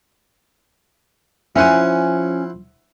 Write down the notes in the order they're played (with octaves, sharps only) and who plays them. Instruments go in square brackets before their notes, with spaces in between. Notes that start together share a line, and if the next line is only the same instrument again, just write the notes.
[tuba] F3 [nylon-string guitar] C#4 G#5 [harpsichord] E4 C5 F#5